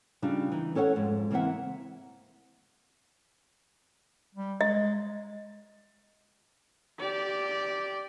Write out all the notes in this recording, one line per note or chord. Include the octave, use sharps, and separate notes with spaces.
C#3 G3 D4 D#4 F4
E3 D#4
C#4 A4 C#5 D5 F#5
F2 G#2
C#3 E3 A#3 C4 E5 F#5
G3
G#3 D#5
G4 D5